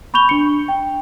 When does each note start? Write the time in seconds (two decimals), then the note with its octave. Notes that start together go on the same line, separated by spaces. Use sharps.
0.14 B5 C#6 G6 F7 G7
0.29 D4 C#7
0.68 G5